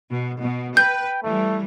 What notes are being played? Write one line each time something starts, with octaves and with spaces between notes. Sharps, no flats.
B2
B2
B4 G5 G6
E3 G3 A3